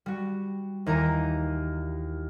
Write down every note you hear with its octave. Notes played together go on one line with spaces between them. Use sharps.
G3 F#4
D#2 E3 A#4 A#5 D#7